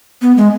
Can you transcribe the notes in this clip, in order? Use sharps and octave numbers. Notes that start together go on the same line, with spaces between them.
B3
G#3